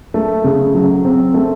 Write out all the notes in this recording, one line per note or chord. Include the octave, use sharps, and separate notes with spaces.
A3
C#3
F#3
C4
A3